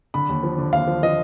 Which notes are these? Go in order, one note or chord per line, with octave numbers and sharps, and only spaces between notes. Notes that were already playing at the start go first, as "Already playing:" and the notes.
D3 B5
D#2
F3
D3
D#2 F5
F3
F3 D#5